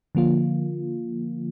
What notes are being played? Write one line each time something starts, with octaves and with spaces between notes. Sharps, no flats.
D3 F3 A#3 F4